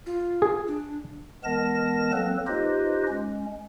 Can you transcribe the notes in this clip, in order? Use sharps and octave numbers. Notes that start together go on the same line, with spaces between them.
F4
G#4
D4
E3 G#3 B3 A#4 A5 A#6
F#3 A#3 C4 A4 B4
D#4 F4 G4 B4 C5 D#5
G#3 C#4